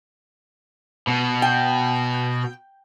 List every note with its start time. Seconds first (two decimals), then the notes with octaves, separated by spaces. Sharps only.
1.08 B2
1.42 G5